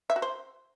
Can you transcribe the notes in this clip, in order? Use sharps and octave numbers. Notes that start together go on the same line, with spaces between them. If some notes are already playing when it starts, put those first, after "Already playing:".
E5
F#4
C5